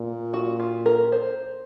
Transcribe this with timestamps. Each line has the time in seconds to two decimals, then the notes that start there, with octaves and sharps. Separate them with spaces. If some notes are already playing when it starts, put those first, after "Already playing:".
Already playing: A#2
0.34 F#4
0.60 F4
0.86 A#4
1.12 C5